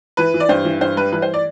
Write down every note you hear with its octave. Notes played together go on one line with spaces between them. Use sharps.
E3 B4
E3
D5
G2 C5
E3
G2 C5
G3 B4
E3 B4
C5
D5